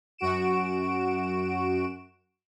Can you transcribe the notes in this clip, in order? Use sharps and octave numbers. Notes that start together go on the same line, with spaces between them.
F#2 F#4 D7 E7